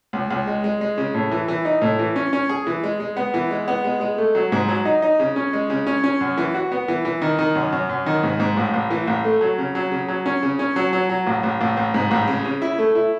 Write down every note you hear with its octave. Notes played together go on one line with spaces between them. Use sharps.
C#2
C#2
G#3
G#3
G#3
C#3
A2
E3
E3
D#4
A2
E3
C#4
C#4
G#4
E3
G#3
G#3
B3
E3
G#3
B3
G#3
G#3
A3
F#3
G#2
F#3
D#4
D#4
C#3
C#4
G#3
C#3
C#4
C#4
F#2
E3
F#4
B3
E3
E3
D#3
D#3
F#2
F#2
F#2
D#3
G#2
G#2
A1
A1
E3
A1
A3
F#3
C#3
F#3
C#3
F#3
C#4
C#3
C#4
F#3
F#3
F#3
A1
A1
A1
A1
G#2
A1
C#3
C#3
E4
A3
E4